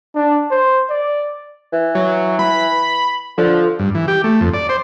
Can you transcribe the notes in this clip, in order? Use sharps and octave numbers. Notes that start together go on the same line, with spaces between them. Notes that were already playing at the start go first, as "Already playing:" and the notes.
D4
C5
D5
E3
F#3
B5
D3 F3
G2
E3
G4
A3
F2
D5
C5